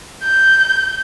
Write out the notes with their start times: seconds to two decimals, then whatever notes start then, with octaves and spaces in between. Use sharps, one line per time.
0.24 G6